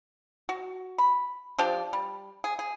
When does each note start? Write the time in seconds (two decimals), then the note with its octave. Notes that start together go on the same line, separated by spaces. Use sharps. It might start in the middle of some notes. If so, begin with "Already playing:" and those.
0.49 F#4
0.98 B5
1.59 F3 D4 G4 D5
1.93 G3
2.44 G#4
2.59 G#4